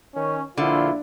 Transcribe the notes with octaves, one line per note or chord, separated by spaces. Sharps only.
D#3 C#4
A#1 D3 E4 F4